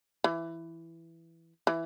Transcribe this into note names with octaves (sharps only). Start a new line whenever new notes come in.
E3
E3